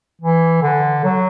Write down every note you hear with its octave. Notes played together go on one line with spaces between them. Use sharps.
E3
D3
F#3